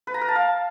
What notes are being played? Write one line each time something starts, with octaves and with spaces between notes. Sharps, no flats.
B4
A#5
A#4
A5
F5